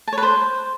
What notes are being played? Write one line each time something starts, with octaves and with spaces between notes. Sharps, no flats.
A5
C#5
B4
C5